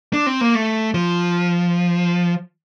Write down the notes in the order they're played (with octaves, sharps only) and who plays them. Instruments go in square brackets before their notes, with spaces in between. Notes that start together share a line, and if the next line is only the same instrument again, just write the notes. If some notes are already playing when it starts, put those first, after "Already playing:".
[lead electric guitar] D4
C4
A#3
A3
F3